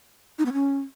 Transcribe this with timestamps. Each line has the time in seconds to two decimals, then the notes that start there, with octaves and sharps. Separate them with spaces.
0.39 D#4
0.46 B3
0.53 C#4